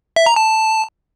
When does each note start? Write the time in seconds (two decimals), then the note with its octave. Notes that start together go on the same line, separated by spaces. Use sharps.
0.16 E5
0.26 A#5
0.36 A5